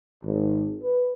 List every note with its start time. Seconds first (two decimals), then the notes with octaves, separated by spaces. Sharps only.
0.23 G#1
0.81 B4